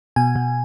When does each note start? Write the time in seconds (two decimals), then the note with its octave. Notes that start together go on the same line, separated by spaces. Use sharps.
0.16 B2 G#5
0.36 B2